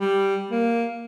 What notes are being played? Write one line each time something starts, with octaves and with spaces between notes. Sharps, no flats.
G3
A#3